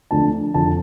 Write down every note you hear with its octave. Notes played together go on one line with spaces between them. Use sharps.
D2 D3 F3 A3 D4 A5
F1 F2 D3 F3 A5